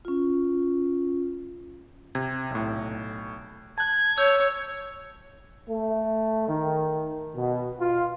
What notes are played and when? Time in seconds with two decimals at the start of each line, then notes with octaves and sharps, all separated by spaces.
0.05 C#4 F4
2.15 C3 G#6
2.50 B1 A2
3.78 A5 F#6 G#6
4.18 C#5 E6 G6
5.68 A3
6.48 D#3
7.35 B2
7.80 F4